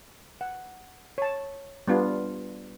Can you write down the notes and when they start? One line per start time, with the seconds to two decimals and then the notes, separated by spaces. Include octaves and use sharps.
0.41 F#5
1.18 C#5 A5
1.87 G3 B3 D4 F4